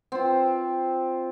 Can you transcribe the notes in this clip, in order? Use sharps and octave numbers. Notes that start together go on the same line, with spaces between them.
C4 F4